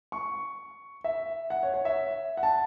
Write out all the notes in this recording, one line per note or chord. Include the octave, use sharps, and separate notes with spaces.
C#6
E5
F#5
C#5
C#5
E5
F#5
A5